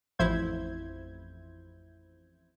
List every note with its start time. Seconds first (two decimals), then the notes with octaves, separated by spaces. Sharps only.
0.19 A1 F2 E4 C5 G6 G#6